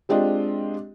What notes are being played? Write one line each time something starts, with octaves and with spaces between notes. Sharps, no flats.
G#3 C4 D4 F4 G4 D#5